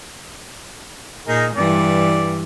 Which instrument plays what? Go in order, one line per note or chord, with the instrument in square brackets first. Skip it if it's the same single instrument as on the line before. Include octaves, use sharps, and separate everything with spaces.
[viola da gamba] A#2 [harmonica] D#4 G#4 A#4
[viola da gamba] G2 E3 [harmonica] D5